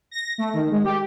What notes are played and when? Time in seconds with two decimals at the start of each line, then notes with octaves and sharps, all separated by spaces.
0.11 A#6
0.38 A3
0.54 D#3
0.71 G#3
0.84 G4